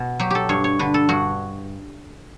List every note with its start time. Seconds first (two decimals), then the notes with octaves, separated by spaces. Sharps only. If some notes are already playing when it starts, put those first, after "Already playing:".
Already playing: B2
0.19 F#3 G4
0.30 G4 A4
0.49 G2 C#5
0.64 C#5
0.79 D3 B4
0.94 A4
1.09 G2 F#4